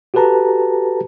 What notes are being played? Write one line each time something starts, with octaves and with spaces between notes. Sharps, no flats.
F#4 G4 A4 B4 A5 A#5